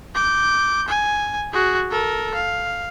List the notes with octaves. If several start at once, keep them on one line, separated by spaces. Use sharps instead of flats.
D6 G6
G#5
F#4 G#4
A4 A#4
F5